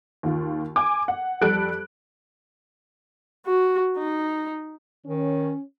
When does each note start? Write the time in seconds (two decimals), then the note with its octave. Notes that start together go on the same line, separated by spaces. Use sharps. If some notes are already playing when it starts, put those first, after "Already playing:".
0.23 D#2 F4
0.76 G#5 D6
1.08 F#5
1.41 F2 G3 A4 F#6 D7
3.46 F#4
3.98 D#4
5.06 D#3 C#4